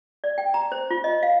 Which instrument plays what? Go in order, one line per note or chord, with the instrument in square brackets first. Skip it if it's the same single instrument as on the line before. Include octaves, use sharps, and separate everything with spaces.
[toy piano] D5
G5
A#5
C5
F4
D#5
F5